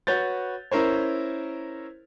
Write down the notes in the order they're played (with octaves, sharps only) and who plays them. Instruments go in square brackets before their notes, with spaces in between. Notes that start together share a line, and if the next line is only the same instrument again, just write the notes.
[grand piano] F#4 B4 C#5 G6 A6
C#4 E4 A#4 C5 C#5